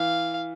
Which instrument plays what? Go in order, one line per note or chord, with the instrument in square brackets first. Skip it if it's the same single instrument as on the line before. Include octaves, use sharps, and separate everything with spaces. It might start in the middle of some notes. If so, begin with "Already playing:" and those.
Already playing: [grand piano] E3 [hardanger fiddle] F5